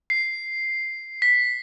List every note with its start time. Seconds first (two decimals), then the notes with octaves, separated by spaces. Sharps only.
0.10 C7
1.22 B6